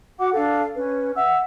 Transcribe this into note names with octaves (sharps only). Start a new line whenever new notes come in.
F#4 F#5 D6
D4 A4 F5
C#4 B4
E5 F#5 E6